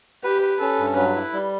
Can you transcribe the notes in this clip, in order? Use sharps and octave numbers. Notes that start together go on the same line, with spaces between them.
G4 B4
B4
C#4 A4
G2
F#3 B4
E4
G3